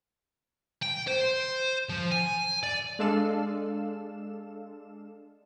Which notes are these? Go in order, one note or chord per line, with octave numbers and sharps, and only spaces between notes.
G5
C5
F3
G#5
D5
G#3 D4 A4 F5 E7